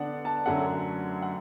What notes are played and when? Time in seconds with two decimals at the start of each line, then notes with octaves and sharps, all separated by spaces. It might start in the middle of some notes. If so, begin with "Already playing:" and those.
Already playing: D3 B3 D4 D5 F#5
0.25 A5
0.46 F#2 D3 F#3 A3 F#5
1.22 F#5